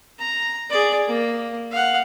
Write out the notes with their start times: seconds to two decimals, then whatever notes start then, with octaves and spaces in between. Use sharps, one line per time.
0.19 A#5
0.70 G#4 D5
1.07 A#3
1.72 F5 F#5